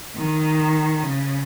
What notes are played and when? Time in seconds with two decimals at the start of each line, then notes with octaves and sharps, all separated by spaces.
0.16 D#3
1.02 C#3